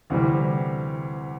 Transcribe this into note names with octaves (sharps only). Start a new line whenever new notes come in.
D2 C3 E3 G3